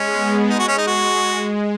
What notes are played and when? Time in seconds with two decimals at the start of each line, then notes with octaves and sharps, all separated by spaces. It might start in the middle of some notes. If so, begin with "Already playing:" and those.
Already playing: G#3 C#4
0.12 B3
0.49 G#3 D#4
0.59 F#4
0.68 C#4
0.78 D#4
0.87 F#4